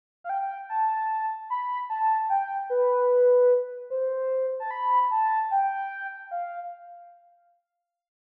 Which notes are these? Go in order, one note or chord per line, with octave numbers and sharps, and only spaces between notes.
F5
G5
A5
B5
A5
G5
B4
C5
A5
B5
A5
G5
F5